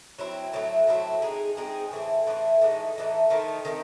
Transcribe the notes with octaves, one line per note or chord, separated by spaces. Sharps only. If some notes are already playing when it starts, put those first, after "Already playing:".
F#3 C4 E4
A2 F#3 C4 E4
A2 F#3 C4 E4
G#3 C4 D#4 G#4
G#3 C4 D#4 G#4
A2 E3 C4 E4
A2 E3 C4 E4
A2 E3 G#3 D#4
A2 E3 G#3 D#4
D#3 A3 C4 D#4
D#3 A3 C4